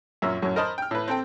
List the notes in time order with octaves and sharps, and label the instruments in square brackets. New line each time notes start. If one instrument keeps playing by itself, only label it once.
[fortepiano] F#2 A#2 C#4 E5 A#5
F#2 A2 F#3 C#5
A#4 C5 D#5 A5 B5
G5 F6
A2 B4
C4 A4 G5